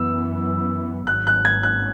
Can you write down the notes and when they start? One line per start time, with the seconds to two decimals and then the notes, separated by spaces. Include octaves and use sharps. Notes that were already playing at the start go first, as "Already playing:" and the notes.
Already playing: F#2 E3 B3 E6
1.07 G#1 G#2 F#3 F#6
1.27 F#6
1.45 G#6
1.63 F#6